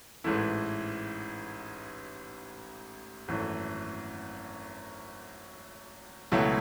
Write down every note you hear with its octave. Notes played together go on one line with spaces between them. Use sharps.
A1 G#2 E3 A3 E4
G#1 F#2 E3 A3
C#2 B2 F#3 A3 E4